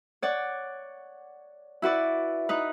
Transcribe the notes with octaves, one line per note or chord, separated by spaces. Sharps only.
C#5 D5 F#5
E4 F#4 B4 D5
D#4 B4